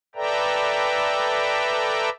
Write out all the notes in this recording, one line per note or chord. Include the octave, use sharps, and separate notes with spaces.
A4 B4 D5 E5 G5 A#5